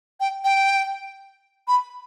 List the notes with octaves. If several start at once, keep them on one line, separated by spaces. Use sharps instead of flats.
G5
G5
B5